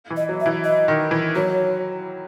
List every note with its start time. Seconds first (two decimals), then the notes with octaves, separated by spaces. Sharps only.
0.10 E3
0.17 D#5
0.29 F#3
0.41 E5
0.46 E3
0.64 D#5
0.88 D#3
1.11 E3
1.35 F#3 C#5